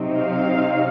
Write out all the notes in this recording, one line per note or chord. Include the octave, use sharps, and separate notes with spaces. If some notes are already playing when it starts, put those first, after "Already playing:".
Already playing: C3 F#3 C4 D#4
F5